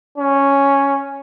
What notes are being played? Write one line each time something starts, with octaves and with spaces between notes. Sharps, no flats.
C#4